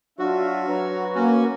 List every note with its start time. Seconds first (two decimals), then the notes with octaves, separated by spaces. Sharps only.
0.19 F#3 D4 F4 F#4 E5
0.68 F#3 B4 C#5 A#5
1.15 A#3 C#4 F#4